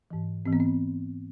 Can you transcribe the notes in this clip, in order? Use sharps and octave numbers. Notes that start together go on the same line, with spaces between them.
G#2 E3
G#2 E3 C4
B3
C4